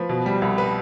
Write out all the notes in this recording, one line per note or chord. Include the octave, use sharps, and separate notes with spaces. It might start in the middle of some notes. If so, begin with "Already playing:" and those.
Already playing: F3 B4
B2
G3
C2
B4